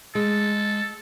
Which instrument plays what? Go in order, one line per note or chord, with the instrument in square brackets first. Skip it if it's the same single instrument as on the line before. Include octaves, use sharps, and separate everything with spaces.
[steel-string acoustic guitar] G#3 [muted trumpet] A4